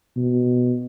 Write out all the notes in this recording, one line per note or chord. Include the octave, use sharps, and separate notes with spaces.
B2